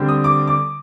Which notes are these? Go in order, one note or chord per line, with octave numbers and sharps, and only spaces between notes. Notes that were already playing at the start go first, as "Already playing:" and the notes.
Already playing: D3 G3 C4
D#6
D6
D6